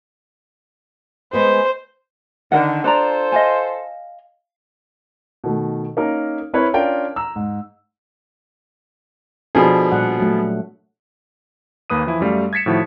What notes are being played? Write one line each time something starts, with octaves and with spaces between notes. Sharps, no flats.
G#3 B3 G#4 C5
D3 D#3 A#4 F#5
D4 F4 A4 C5 D5 A#5
D#5 F5 G#5
B2 D#3 A3
A#3 C#4 D#4 A#4
C4 E4 A#4 B4 C#5
C#4 D4 F4 A#4 G5
A#5 E6
G#2
B2 F3 B3 D4 G#4 A4
A#2 G3 F#5
F#3 A3
D#2 A#3 B4 D#6 D#7
E3 F3 E4
F#2 G3 A3 F5
G#6 A6 B6 C#7 E7
A2 D#3 F3 E4 F#4